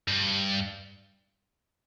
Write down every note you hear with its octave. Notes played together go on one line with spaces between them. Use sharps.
G2